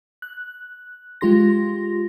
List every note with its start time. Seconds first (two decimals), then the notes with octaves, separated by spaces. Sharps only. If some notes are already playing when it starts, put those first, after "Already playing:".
0.22 F#6
1.21 G#3 F4 G4 C6 A#6